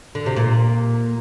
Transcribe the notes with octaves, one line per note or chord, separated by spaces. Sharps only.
D3
C3
A#2